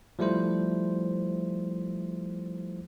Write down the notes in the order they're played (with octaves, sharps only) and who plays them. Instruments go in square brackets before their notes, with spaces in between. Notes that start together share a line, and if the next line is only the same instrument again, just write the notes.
[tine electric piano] F3 G3 A3 E4 C5